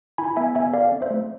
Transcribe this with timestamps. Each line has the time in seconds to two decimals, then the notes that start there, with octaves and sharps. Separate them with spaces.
0.18 E4 G#5 B5
0.36 B3 E5 G#5
0.55 B3 E5 G#5
0.73 A4 D5 F5
0.92 C4
1.02 C5 E5
1.11 A3